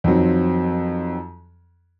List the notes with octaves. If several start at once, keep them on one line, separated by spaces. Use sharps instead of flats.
F2 D#3 F#3 C4